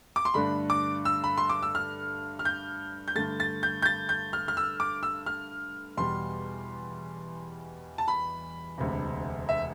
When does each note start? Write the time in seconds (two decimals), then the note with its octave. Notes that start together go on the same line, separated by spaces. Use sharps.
0.16 D6
0.25 C6
0.34 G2 D3 A3 D4 B5
0.70 D6
1.05 E6
1.24 B5
1.38 C6
1.50 D6
1.62 E6
1.75 F6
2.39 F6
2.45 G6
3.08 G6
3.15 G2 D3 A3 A6
3.40 A6
3.63 G6
3.82 G6
3.85 A6
4.09 G6
4.33 F6
4.48 F6
4.57 E6
4.80 D6
5.03 E6
5.26 F6
5.97 E2 B2 G3 C6
7.98 A5
8.08 B5
8.78 E1 D2 C3
9.49 E5